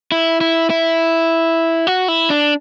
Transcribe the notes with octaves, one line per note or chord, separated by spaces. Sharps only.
E4
E4
E4
F#4
E4
D4